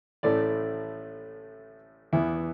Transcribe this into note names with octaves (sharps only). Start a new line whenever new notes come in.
A1 A2 A3 D5
E2 E3 B3 E4